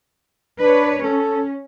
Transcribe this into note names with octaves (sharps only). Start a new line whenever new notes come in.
D4 B4 C#5
C#4 A4